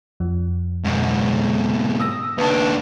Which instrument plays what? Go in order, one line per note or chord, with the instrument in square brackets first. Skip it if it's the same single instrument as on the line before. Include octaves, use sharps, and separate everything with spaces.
[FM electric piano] F2 F3
[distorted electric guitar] G#2 B2
[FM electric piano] D#6 E6 A#6
[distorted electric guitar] D#2 D4 [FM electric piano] B4 A5